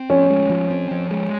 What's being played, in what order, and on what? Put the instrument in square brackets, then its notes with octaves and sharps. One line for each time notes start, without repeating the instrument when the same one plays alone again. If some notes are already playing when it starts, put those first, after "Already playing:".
Already playing: [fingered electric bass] C4
[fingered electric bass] F3 [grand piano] C#4
[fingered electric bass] G#3
F3
C4
F3
G#3